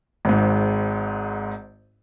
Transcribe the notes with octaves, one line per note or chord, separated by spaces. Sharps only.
G#1 G#2